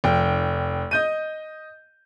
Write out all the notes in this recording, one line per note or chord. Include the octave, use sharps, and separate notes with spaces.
F1 G5
D#5 G6 D#7